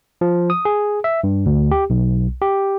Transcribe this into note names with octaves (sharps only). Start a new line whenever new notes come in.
F3
D#6
G#4
E5
G2
D2
G4
B1
G4